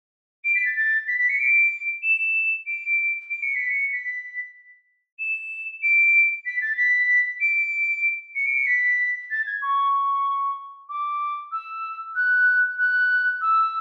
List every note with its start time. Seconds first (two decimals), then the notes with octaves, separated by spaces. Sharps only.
0.44 D7
0.55 B6
0.65 A6
0.75 A6
1.07 B6
1.18 B6
1.29 C#7
1.39 D7
2.02 E7
2.66 D7
3.29 D7
3.42 C#7
3.55 B6
3.69 C#7
3.92 B6
5.19 E7
5.82 D7
6.46 B6
6.61 A6
6.77 B6
7.40 D7
8.35 C#7
8.46 D7
8.56 C#7
8.66 B6
9.30 A6
9.46 G#6
9.62 C#6
10.89 D6
11.52 E6
12.15 F#6
12.78 F#6
13.41 E6